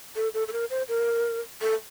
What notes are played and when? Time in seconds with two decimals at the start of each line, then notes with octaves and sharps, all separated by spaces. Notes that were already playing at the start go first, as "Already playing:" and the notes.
0.16 A4
0.34 A4
0.48 A4
0.53 A#4
0.70 C5
0.88 A#4
1.61 A4